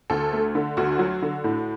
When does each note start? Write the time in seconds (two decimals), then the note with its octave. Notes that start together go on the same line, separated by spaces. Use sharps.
0.10 D2 A4
0.33 A3
0.55 D3
0.77 D2 F#4
0.99 F#3
1.22 D3
1.44 A2